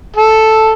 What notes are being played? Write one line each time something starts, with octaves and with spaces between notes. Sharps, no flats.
A4